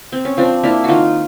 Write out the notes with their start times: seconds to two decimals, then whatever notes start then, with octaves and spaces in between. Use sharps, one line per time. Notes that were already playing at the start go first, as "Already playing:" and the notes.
0.12 C4
0.25 C#4
0.37 F3 C4 D4
0.63 A#3 D4 E4
0.84 D#3 D#4 F4 F#4